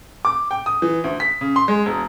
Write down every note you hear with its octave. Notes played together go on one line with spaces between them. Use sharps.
D6
G5
D#6
E3
D2
B6
C#3
C6
G#3
E1